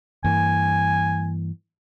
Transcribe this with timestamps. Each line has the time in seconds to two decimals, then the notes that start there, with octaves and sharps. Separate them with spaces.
0.24 G2 E3 A#3 G#5